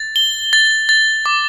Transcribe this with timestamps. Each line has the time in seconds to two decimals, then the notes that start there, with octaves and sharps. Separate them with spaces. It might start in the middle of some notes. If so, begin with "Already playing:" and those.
Already playing: A6
0.16 G7
0.53 A6
0.89 A6
1.26 D6